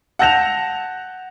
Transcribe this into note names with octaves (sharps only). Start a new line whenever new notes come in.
F#5 A5 G6 A#6 E7 F7